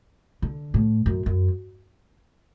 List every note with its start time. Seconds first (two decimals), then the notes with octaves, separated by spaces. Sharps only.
0.42 D3
0.74 A2
1.06 F#2
1.26 F#2